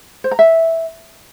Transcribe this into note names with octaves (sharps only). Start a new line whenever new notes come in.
C5
A#5
E5